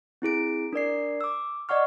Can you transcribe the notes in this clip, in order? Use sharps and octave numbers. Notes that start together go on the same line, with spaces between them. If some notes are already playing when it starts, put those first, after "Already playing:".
C4 E4 G#4 D7
D4 A#4 D5 C7
D6 E6
D5 D#5 F#5 C#6 F6